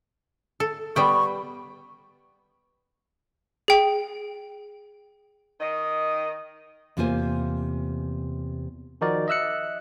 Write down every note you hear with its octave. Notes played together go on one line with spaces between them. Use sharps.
A4
G3 B3 G5 C#6
G#4 G5
D#3 D#5
E2 C3 A#3 F4 C5 G#5
D#3 F3 D#4 F#4 A#4 D5
D#5 E5 E6 F#6 C#7